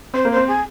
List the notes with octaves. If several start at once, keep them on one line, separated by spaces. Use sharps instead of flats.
C4 C5
A#3
C5
C4
G#4